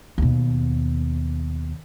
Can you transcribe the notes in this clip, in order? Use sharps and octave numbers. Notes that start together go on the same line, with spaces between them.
D#2 B2